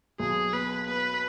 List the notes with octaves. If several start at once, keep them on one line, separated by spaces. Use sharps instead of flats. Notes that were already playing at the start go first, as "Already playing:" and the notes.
B1 G#4
B3 B4
B3 B4